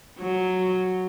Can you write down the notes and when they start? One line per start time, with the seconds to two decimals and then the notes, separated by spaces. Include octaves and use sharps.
0.19 F#3